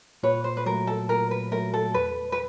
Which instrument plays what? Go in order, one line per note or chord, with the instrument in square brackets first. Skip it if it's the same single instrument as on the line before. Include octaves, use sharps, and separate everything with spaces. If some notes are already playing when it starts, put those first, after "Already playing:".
[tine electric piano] A#2 [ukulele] B4 C#5
[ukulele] C5
B4
[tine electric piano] F#3 A3 [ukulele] A#4
[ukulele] A4
[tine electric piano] A#2 [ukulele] A#4
[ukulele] B4
[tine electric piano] F#3 A3 [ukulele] A#4
[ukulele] A4
[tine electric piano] E2 [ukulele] B4
[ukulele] B4